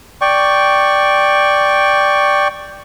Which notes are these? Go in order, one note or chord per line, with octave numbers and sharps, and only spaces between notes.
D5 G5 C#6